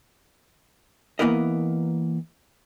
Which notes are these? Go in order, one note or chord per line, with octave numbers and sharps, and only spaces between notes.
E3 A#3 B3 E4 A#4 D#5